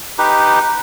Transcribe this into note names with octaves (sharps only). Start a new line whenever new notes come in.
D#4 G4 B4